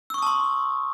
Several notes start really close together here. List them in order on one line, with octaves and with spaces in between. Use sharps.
E6 C#6 D#6 A5 C6